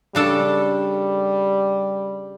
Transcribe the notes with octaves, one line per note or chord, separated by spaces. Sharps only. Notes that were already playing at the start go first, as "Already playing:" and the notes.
C#3 G3 D4 A4